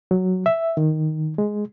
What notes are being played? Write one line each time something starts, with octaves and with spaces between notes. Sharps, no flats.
F#3
E5
D#3
G#3